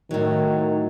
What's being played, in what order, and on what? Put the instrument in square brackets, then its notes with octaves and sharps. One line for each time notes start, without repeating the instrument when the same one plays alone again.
[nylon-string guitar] A2 F#3 [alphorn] D#3